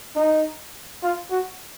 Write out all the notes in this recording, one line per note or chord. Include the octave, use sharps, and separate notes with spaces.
D#4
F4
F#4